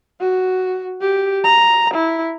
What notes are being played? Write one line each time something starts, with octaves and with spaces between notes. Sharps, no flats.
F#4
G4
A#5
E4